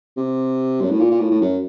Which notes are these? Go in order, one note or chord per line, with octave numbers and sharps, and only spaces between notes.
C3
F#2
A2
A#2
A#2
A2
A2
F#2